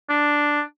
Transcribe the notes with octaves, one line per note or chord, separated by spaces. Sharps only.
D4